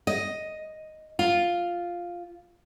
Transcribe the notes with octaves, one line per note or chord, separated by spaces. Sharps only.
D#5
F4